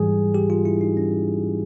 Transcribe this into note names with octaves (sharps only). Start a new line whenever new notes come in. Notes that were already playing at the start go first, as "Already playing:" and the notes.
Already playing: G#2 E3 G3 G#4
G4
F4
E4
D#4
C#4